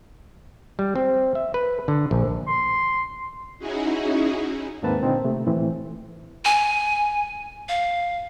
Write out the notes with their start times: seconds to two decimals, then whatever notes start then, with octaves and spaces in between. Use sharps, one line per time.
0.79 G3
0.96 C4
1.35 E5
1.54 B4
1.88 D3
2.11 A#1
2.47 C6
3.59 C#4 D#4 E4 F#4 G#4
4.83 D#2 G#2 A#3 C4 B4 A5
5.02 A#2 D3 C4 D#4
5.24 C3 A3
5.47 A2 E3 C4
6.45 G#5
7.69 F5